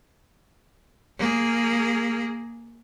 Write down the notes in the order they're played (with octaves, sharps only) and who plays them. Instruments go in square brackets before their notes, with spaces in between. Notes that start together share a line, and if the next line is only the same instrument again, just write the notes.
[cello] A#3 G#4